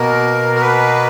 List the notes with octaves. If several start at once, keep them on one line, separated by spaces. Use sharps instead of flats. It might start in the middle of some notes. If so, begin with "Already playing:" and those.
Already playing: B2 A#3 A#4
A#4
B4